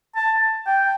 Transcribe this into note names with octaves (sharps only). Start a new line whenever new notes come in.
A5
G5